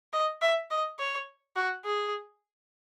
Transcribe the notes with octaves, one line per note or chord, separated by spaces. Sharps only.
D#5
E5
D#5
C#5
F#4
G#4